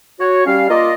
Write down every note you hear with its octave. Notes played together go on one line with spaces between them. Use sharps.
F#4 C#5
G3 C#4 F5
A#3 F4 D5 D#5